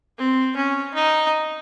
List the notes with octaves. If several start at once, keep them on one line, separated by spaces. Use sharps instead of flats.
C4
C#4
D#4